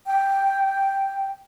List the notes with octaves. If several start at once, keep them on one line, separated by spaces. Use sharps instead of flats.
G5